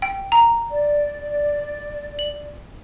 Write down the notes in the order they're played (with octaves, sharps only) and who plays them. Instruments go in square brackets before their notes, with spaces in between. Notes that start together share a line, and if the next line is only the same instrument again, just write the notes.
[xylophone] G5
A#5
[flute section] D5
[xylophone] F#7